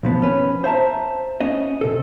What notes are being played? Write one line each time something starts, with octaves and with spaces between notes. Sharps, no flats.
B1 F3 B3
C#4 B4
C5 E5 A5 A#5
C#4 D#5
C3 A4